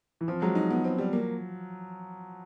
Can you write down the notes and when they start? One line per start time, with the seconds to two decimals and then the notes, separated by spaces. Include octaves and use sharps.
0.21 E3
0.28 F3 C4
0.42 F#3 G#3
0.55 D#4
0.70 B3
0.84 C4
0.98 G3
1.13 A#3